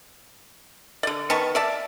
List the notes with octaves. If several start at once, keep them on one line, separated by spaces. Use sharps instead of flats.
D3 D5
D#3 B3 A5 C#6
D5 E5 A5